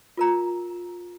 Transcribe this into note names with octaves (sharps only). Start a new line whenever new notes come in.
F4 A#4 A#5